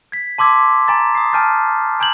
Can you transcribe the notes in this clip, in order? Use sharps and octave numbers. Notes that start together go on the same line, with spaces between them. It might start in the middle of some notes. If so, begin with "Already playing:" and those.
G#6 B6
A5 C6 D6 E6 G#6 B6
G#5 A#5 A6
D#6 C7
G#5 A5 F6 G6 A6
G#5 A#5 G6 G#6 F#7